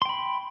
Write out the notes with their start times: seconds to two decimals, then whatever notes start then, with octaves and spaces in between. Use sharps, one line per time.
0.02 C6
0.05 G5
0.09 B5